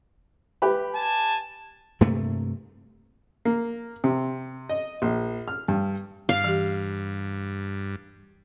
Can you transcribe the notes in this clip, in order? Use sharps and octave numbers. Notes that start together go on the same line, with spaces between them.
G4 B4 B5
G#5 A5
G2 C3 A3 A#3
A#3
C3
D#5
A#1
F6
G2
G2 F5
E3 G4